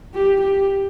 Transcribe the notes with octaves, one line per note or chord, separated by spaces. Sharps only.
G4
G4